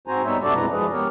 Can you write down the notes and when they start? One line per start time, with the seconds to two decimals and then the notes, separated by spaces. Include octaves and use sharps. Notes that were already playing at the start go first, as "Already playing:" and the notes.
0.07 G#2 C4 F#4 C5 G#5 A#5
0.25 G3 B3 D#4 C#5 E5
0.43 F#2 C3 D4 F#4 A4 D5
0.56 F2 B2 G#3 E4 B4 A#5
0.72 F3 G#3 G#4 B4
0.92 B3 G4 A#4 C#5